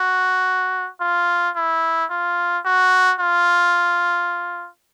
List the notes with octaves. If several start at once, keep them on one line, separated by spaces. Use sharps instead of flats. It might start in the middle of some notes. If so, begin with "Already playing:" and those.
Already playing: F#4
F4
E4
F4
F#4
F4